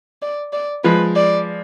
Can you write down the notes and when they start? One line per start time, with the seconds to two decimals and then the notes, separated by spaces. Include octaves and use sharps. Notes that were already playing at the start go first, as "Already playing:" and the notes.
0.22 D5
0.53 D5
0.84 F3 G#3 B4
1.16 D5